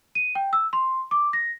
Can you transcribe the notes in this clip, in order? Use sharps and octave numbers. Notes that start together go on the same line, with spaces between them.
D#7
G5
E6
C6
D6
A#6